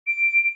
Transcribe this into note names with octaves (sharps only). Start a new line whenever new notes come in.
D7